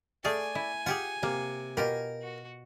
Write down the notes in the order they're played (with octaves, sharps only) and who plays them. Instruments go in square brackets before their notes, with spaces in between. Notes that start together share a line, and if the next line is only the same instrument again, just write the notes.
[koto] A3 G#4 F5 [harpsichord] D5 [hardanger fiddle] G#5
[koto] E4
[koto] F4 G4 G#4 [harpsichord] F#5
[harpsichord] C3 [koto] A#3
[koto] B2 F4 G4 [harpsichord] A#4
[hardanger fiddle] F#4